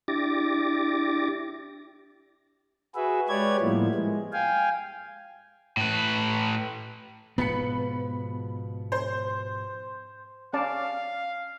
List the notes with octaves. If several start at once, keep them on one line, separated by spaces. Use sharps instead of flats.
D4 E4 G4 D6 A6 A#6
F#4 G#4 B4 E5
G#3 G4 B4 C#5 D5 G#6
A2 F3 G3 A#3 B3 E4
G#3
F5 G5 G#5
A2 B4
G#2 B2 F3 B3 B5 C#7
C5
C#4 D5 F5 A5